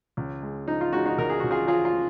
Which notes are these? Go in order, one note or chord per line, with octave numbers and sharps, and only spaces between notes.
C#2
G#3
F3 D#4
F4
G#3 D#4 F#4
D#4 F#4
C#2 A#4
G#4
C#2 F#4
F4 G#4
F3 F4 G#4
F4
F3